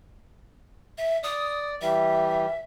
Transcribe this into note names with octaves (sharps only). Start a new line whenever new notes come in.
E5
D5 D#6
E3 G3 E5